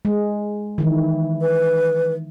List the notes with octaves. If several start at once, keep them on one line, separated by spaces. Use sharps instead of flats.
G#3
D#3 E3
B4